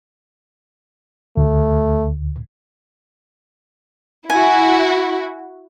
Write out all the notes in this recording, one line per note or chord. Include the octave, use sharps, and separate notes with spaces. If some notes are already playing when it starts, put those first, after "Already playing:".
D2 A3
E4 F#4 G#5